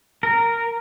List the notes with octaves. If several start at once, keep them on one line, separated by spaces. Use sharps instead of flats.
A#4